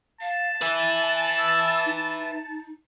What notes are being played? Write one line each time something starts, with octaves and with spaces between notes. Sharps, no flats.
F5 A5
B4 E5 G#5
E6
D#4